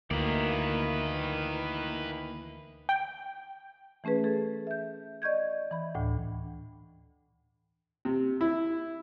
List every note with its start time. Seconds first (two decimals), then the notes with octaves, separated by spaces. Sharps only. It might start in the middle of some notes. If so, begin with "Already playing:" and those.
0.11 D2 D#3 E3 A#3 B4 D5
2.89 G5
4.04 E3 A3 C#4 G#4 B4
4.24 G#4 A4
4.67 E5 G6
5.22 D5 D#5 C#6 G6 G#6
5.71 E3 B5
5.95 D2 A2 D4 G5
8.05 C3
8.41 E4